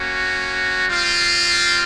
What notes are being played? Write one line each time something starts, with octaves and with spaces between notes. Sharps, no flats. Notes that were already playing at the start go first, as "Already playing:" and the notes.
Already playing: A#3 C#4 F#4
G3 C4 F4